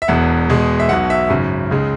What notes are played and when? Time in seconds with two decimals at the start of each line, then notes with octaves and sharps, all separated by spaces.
0.02 E5
0.08 E1 E2 B2 F#5
0.49 E2 B2 G#3
0.80 E5
0.89 B1 B2 F#3 F#5
1.10 E5
1.30 G#1 F#2 C#3 F#3
1.71 C#2 C#3 G#3